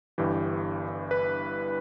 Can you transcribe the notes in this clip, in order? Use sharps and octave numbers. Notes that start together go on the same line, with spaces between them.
G1 G2 E3 G4
B4